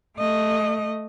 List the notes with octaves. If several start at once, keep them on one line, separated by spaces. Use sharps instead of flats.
A3 D#5